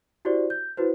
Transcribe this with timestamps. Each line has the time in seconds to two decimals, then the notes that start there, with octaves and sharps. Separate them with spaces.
0.25 E4 F#4 G4 C5 D5
0.50 G6
0.77 E4 F#4 B4 C5